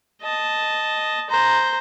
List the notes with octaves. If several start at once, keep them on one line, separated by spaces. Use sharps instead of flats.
D#5 A5
C5 A#5